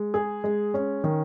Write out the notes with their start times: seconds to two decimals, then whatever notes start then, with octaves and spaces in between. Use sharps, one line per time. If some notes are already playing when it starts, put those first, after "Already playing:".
Already playing: G#3
0.14 G#4
0.44 G#3
0.74 C#4
1.04 D#3